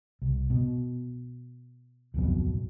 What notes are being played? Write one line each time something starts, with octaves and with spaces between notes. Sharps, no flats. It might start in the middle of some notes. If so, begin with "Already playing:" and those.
C2
B2
D1 B1 F2 B2